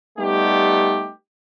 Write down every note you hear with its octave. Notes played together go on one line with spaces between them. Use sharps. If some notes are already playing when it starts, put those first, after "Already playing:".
G3 A3 B3 D#4 G4